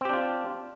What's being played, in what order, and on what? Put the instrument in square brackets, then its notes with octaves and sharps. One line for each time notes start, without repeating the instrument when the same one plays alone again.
[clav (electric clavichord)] C4
G4
D4
F4